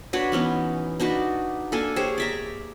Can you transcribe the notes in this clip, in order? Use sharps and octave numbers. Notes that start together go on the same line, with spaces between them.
D4 F#4 B4 C#5
E3 B3 C#4 D#4
D4 D#4 F#4 B4
A#3 D4 A4 G#5
G4 G#4 C5 C#5
D5 E5 A#5